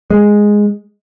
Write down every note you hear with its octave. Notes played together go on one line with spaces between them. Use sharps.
G#3